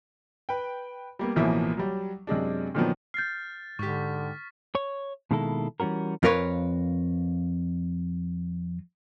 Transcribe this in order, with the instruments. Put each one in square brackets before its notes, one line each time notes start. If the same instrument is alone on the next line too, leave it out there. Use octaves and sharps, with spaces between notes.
[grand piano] B4 G5
G3 A#3 B3
A1 B2 E3 F3 A#3 E5
F#3 G3
F#2 C3 G#3 D4
A#2 D3 D#3 F3 F#3 B3
[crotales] F6 A6 [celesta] G6 C7
[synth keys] G#2 G4 [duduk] D3 [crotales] C#6 B6
[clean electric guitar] C#5
B2 D#3 G#3 A#3 E4 A4
E3 G3 C#4 F#4 A#4
[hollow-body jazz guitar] F2 F4 A#4 B4 C#5